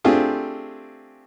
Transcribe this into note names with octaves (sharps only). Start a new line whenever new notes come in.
A3 C4 D4 F4 G4 G#4